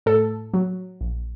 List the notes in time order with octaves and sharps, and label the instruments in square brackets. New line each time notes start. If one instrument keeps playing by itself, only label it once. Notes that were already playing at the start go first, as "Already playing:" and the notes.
[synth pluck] A2 A4
F#3
A#1